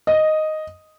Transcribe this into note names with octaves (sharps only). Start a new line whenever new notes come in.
D#5